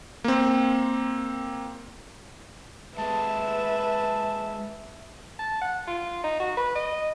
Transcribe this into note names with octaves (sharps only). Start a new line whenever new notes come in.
A#3 C4
G#3 A#3 B4 E5 A5
A5
F#5
F4
D#4
F#4
B4
D#5